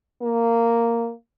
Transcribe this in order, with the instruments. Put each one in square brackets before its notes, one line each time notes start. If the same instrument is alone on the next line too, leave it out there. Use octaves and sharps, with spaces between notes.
[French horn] A#3